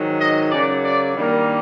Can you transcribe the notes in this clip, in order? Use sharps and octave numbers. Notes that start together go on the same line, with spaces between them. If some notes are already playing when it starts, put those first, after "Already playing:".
Already playing: G#2 D#3 F#3
D#5
F#2 C#3 F#3 D5
D5
G2 D#3 G3 A#3